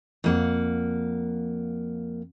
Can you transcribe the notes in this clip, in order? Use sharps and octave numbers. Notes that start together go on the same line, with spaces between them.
F2 A#3 F#5